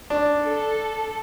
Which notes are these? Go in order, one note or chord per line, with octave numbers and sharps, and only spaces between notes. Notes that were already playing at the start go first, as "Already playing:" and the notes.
D4
A4